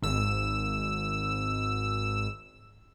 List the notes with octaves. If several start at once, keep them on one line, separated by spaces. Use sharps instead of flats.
G#1 E6